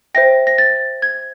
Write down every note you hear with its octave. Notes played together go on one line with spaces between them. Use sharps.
C5 E5 G5 A#6
A#6
A6
G#6